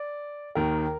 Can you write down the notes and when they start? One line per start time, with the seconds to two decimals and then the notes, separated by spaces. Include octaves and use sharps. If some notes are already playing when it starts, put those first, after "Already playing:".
Already playing: D5
0.55 D#2 D#3 A#4